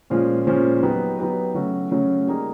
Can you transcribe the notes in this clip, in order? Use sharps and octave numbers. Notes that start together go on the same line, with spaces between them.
A#2 F3 G#3 C#4 F4
A#2 F3 G#3 C#4 F4
F#3 B3 D#4 G4 B4
F#3 B3 D#4 G4 B4
C#3 F#3 A3 C#4 F#4
C#3 F#3 A3 C#4 F#4
G3 A#3 D#4 G#4